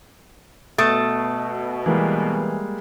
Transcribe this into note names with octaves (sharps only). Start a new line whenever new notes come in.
B2 A3 D#6 A6
E3 G3 G#3 A#3